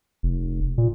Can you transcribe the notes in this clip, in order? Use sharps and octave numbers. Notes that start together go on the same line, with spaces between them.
F1
A#2